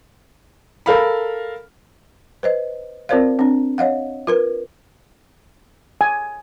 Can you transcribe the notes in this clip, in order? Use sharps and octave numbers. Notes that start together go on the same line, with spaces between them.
A4 A#4 F5 B5
B4 C5 D#5
C4 F4 A#4 C5 D5 F5
C4 D4
C#5 D#5 F5 F#5
F4 A#4 B4
G#5